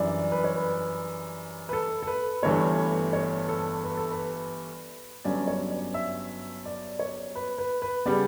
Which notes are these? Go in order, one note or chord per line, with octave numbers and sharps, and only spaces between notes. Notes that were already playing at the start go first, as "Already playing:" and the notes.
Already playing: F#2 E3 G3 D4 D5
B4
C#5
B4
B4
A4
A4
B4
G1 G2 E3 A3 C#5
C#5
A4
B4
A4
B4
G1 G2 F#3 C#4 D5
C#5
D5
E5
D5
C#5
B4
B4
B4
C#3 G3 B3 D5